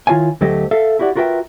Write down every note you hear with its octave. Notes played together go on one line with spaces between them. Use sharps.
D#3 E4 F4 C#5 F5 G#5
D2 F#3 A3 G4 C5 D#5
A4 E5 F5
E4 F#4 G4 D5 F#5
F4 F#4 A#4 B4 E5 G5